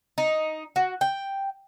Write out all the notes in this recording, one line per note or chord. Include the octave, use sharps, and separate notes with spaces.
D#4
F#4
G5